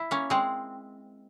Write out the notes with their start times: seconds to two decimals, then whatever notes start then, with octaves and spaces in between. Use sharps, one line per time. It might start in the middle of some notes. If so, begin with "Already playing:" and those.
Already playing: E4
0.11 A#3 C#4
0.30 G#3 C4